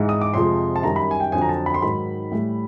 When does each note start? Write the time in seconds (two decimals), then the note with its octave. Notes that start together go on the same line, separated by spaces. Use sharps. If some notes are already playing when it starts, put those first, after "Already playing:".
Already playing: G#2 E3 G#3
0.09 D#6
0.21 D6
0.34 F2 C3 F3 G#3 C6
0.76 A5
0.83 F#2 D#3 G3 A#5
0.96 B5
1.11 G#5
1.20 G5
1.32 F2 D3 F#3 G#5
1.42 A#5
1.49 A5
1.66 B5
1.74 C6
1.82 G#2 D#3 F#3 B5
2.32 A2 E3 G3